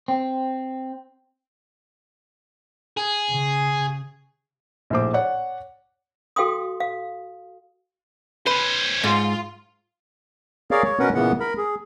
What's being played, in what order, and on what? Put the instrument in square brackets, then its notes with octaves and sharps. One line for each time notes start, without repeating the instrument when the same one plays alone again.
[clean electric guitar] C4
[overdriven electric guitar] G#4
[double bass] C#3
[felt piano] A#1 A2 C5 D6
C#5 D5 F#5
[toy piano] F#4 A4 F5 G5 C6 D#6
F5
[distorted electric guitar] C#4 C5 [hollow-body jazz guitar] B4
[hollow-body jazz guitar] G#2 [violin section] F4
[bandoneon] G#4 A#4 C#5 D5 F5
C#5
B2 C#4 A#4 B4 F#5
A#2 C#3 E3 B3 F#5
A#4 B5
G#4